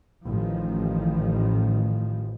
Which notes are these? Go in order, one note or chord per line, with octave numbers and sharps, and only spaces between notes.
A1 D#3 F3